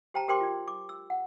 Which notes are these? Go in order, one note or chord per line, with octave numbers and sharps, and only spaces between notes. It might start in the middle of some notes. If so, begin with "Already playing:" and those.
G4 C5 G5 A5 A#5
G4 A#4 C5 G5 C6 D6
F4 D5
D6
E6
F#5